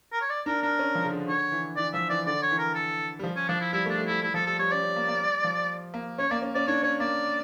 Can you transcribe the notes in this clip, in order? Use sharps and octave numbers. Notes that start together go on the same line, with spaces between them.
A#4
C#5
D5
D4 A#4
D4 A#4
C#4
F3
C#3
D3
D3 C#5
E3
E3 D5
F3 E5
E3 D5
D3 D5
C#5
E3
A#4
A4
G3
F3
C#4
F3 D4
E4
G3 E4
A3
D4
A3
G3 E4
G3 E4
F3 A4
G3 A4
G3 C#5
C#4 D5
C#4
A#3
A#3
G3
F3
A#3
C#4 C#5
A#3 D5
C#4
C#4 D5
D4 C#5
C#4 C#5
A#3 D5